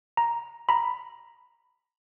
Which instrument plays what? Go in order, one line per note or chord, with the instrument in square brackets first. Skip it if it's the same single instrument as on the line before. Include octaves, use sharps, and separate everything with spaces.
[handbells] A#5
A#5 B5